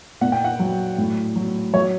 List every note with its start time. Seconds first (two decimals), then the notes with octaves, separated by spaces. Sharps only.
0.21 A#2 F#5
0.32 G5
0.44 F#5
0.60 F#3
0.98 A2
1.36 F#3
1.73 F#3 C#5